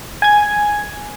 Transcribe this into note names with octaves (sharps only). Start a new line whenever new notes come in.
G#5 G#6